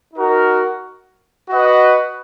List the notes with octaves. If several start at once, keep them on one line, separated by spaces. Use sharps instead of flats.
D#4 F#4 A#4
F#4 B4 D#5 F#5